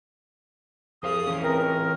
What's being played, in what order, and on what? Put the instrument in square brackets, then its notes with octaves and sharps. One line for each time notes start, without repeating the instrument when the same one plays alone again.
[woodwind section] C2 G#4 D#6 [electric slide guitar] F2 C5 F5
[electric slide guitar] E3 C#4
[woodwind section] C#2 C4 A#4